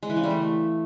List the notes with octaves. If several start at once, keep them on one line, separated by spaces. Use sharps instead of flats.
G#3
E3
C#3
G3
A3